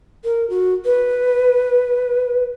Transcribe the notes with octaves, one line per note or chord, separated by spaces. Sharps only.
A#4
F#4
B4